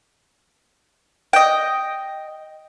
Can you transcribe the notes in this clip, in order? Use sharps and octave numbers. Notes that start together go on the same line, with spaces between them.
D#5 G5